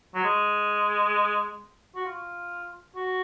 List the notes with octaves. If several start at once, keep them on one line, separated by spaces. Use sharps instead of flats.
F#3
G#3
F#4
F4
F#4